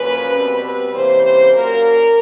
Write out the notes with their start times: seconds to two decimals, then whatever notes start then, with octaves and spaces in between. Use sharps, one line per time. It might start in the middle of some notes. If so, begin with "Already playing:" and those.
Already playing: F#2 C#3 F3 A#3 C#4 B4
0.34 B2 G3 C4 B4
0.63 B4
0.92 C3 E3 G3 A#3 C#4 C5
1.21 C5
1.51 A#2 F#3 A#3 C#4 A#4